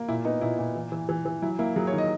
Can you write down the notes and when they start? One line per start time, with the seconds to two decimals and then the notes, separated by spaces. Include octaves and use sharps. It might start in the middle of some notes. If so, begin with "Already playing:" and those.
Already playing: A#3
0.09 A#2 E4
0.25 B3 D#4
0.41 A#2 E4
0.59 A#2
0.75 E3
0.92 E3
1.09 E3
1.25 E3
1.42 F#3 E4
1.59 A#3 E4
1.76 F#3 G#4
1.87 C#5
1.93 D#3
1.98 D#5